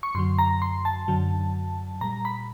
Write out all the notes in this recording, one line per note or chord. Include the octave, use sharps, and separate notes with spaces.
C#6
F#2 D3 F#3 C6
A#5
C6
A5
F#2 D3 F#3
A#2 G3 A#5
B5